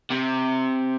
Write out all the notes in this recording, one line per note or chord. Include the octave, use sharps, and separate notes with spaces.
C3